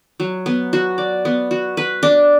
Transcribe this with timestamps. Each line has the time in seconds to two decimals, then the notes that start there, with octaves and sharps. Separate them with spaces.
0.20 F#3
0.46 B3
0.73 F#4
0.98 D5
1.25 B3
1.51 F#4
1.77 B4
2.03 D4